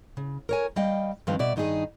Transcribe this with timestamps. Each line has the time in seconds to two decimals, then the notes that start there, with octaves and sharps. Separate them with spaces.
0.17 C#3
0.49 A#4 C#5 G#5
0.76 G3 D#5 F5 G5
1.27 G2 D#3 F3 C4 B4 F5
1.39 B2 D5 E5
1.56 G2 D#3 D#4 F#4 G#4